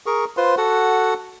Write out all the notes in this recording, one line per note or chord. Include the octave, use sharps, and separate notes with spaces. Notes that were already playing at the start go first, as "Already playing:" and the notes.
G#4 A#4 C#6
F4 B4 C5 C6
F#4 A4 F#5